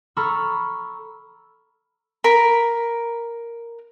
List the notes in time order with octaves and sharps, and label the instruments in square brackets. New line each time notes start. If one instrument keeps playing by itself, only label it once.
[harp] A4 A#5 B5 C#6 E6 F6
[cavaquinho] A#4 B5